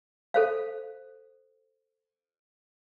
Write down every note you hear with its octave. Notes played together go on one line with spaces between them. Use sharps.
A4 C5 F5